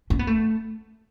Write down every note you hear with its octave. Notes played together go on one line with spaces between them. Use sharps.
C#4
B3
A3